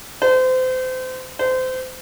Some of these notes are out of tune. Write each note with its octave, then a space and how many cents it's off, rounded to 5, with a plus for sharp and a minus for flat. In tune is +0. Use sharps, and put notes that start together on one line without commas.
C5 -30
C5 -25